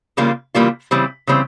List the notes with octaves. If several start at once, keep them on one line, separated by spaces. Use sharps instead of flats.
C#3 E3 G3 A#3 F4
C#3 E3 G3 A#3 F4
C#3 E3 G3 C4
C#3 E3 G3 C4